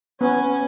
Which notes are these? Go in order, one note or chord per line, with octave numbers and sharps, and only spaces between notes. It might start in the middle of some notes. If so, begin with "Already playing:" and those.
B3 C#4